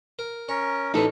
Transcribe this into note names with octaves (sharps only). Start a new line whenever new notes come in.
A#4
C#4 A#4 C#5
A1 A3 D#4 A4 B4